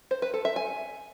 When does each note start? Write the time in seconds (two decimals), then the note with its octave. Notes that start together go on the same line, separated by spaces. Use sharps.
0.11 C5
0.22 B4
0.34 A4
0.45 E5
0.56 G#5